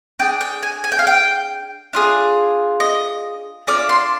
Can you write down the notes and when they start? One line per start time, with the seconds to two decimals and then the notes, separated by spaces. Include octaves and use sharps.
0.19 D4 G#4 G5
0.41 G5
0.63 G#5
0.84 G#5
0.92 G5
0.99 F5
1.07 G5
1.93 D4 F4 G#4
2.80 D#5
3.67 D4 F4 G#4 D5
3.89 C6